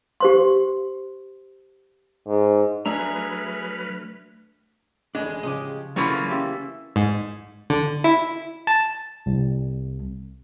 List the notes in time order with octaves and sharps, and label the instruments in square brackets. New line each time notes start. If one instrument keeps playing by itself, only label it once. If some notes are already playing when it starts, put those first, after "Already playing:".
[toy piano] G4 C5 C6
[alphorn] G#2
[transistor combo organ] F#3 B4 F6 [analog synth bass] A3 [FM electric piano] D4 [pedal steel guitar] G#4 E5 A#5
[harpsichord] A1 E3 [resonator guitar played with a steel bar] G#3 [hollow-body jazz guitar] D4
[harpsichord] C#3 F3 G4 [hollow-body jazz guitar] D#5
[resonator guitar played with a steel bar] C#3 E3 A#3 [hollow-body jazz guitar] F#3 A3 D4 [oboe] F4 [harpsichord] C#6
[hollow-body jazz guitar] C#4 G4 [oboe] E5
[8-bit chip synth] G#2
D3
E4
A5
[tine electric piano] C2